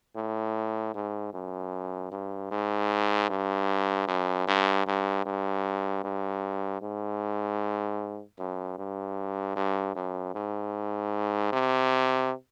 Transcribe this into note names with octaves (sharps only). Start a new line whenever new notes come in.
A2
G#2
F#2
G2
G#2
G2
F#2
G2
G2
G2
G2
G#2
F#2
G2
G2
F#2
G#2
C3